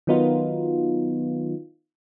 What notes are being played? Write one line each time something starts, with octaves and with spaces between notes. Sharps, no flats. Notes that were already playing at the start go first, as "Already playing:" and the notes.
D#3 F#3 B3 D#4 F4